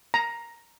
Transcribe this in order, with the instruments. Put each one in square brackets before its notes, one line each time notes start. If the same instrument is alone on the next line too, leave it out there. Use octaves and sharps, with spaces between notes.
[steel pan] A#5